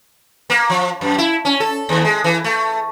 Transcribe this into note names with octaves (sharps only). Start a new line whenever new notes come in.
A#3
F3
F#2
E4
C#4
A4
D#2
G#3
E3
A3